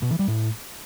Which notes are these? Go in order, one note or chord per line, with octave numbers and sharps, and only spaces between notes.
B2
E3
G3
A2